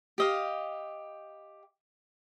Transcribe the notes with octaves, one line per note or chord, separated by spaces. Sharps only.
G4 D#5 F5